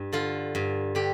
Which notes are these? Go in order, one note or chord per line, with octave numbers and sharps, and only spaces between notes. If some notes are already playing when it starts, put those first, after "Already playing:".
Already playing: G2
D3 F4
G2
D3 G4